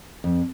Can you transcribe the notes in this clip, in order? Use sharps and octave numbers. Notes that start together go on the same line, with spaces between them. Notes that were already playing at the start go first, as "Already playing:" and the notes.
F2